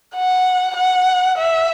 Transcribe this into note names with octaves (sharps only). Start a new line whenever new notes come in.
F#5
F#5
E5